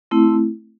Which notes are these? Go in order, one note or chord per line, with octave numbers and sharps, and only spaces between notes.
A3 C4 E4